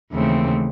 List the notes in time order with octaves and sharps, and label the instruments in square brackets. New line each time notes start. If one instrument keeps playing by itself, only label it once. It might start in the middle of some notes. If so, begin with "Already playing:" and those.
[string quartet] D#2 C#3 E3 A3 C4